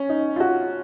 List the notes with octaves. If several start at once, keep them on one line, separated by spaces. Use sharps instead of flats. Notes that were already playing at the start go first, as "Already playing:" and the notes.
Already playing: C#4
D#4
F4
F#4